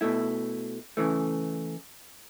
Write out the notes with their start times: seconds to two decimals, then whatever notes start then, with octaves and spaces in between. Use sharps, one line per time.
0.01 B2 A3 E4
0.97 C#3 E3 A3